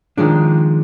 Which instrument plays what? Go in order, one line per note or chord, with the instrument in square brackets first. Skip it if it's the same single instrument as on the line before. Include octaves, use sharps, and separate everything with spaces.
[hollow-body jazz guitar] D#3 F3 G#3 D4